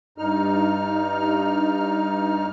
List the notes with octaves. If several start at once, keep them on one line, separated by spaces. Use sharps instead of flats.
G2 D#4 F6